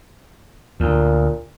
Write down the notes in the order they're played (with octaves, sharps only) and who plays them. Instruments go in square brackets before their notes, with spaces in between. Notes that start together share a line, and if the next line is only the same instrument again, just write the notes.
[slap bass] D2 [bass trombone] A#2